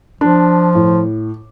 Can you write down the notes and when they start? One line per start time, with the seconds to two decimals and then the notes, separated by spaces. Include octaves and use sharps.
0.21 F3 D4
0.75 A2